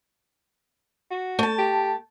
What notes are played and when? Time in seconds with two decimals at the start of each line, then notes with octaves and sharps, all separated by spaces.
1.11 F#4
1.39 A3 A5
1.58 G4